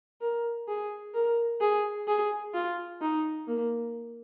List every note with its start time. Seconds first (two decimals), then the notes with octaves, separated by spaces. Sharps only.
0.21 A#4
0.68 G#4
1.14 A#4
1.61 G#4
2.08 G#4
2.54 F4
3.01 D#4
3.48 A#3